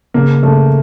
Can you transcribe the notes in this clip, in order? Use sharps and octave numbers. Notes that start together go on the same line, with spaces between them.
C#3 A#3
C#3 A3